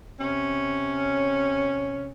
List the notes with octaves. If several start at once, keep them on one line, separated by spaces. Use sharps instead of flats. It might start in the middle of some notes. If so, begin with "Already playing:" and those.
C3 C#4